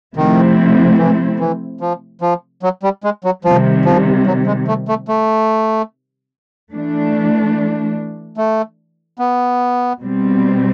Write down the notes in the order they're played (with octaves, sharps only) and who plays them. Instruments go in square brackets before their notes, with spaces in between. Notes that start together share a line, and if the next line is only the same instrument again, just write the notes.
[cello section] C3 F3 A3 C4 E4 [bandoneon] D#3
[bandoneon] E3
E3
F3
F3
F#3
G3
G#3
F#3
[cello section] C3 D#3 G3 [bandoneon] F3
[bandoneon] F3
F#3
G#3
A3
A3
A3
[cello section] E3 A3 D4
[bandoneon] A3
B3
[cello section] B2 G3 C4